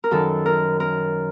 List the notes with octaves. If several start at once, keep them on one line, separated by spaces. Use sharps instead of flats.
A#4
F#2 D#3 A4
A#4
A#4